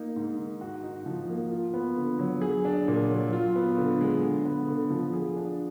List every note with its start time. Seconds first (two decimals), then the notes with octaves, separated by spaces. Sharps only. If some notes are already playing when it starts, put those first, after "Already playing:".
Already playing: A#3 D#4
0.16 G#2
0.38 D#3
0.61 F#4
0.84 D#4
1.06 F3
1.29 A#3
1.51 F4
1.74 B3
1.96 D3
2.19 F#3
2.41 G#4
2.65 D4
2.88 A#2
3.10 F#3
3.33 F4
3.56 B3
3.77 D3
4.01 G#3
4.23 D3
4.46 B3
4.68 D3
4.90 F3
5.14 G#4
5.36 D4